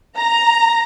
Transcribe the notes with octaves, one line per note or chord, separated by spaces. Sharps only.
A#5